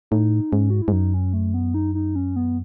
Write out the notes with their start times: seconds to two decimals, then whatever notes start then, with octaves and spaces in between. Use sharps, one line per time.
0.11 A2 D#4
0.52 G#2 C#4
0.70 F#4
0.82 E4
0.88 G#2
0.92 F#2 D#4
1.14 C#4
1.33 A3
1.54 B3
1.74 D#4
1.95 D#4
2.16 C#4
2.36 B3